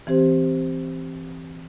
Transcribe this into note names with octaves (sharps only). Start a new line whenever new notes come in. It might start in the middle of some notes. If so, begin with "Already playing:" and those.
E3 C4 G4 C5